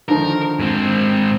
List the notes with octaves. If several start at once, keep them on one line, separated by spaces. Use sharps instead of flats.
D3 D#3 F3 A#4
G#2 C4